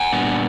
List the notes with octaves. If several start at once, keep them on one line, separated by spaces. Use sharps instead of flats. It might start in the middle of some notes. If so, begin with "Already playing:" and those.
Already playing: F#5 G#5
A#2 G3 B3 D4